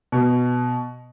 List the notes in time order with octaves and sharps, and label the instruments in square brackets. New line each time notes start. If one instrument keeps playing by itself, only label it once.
[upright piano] B2